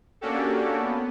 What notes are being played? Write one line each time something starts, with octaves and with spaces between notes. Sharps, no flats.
A#3 C#4 D4 F#4 G4 A4
B3